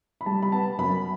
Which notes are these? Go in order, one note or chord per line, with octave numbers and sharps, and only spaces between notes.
B5
G3 A5
B5
B3 A5
F#2 B5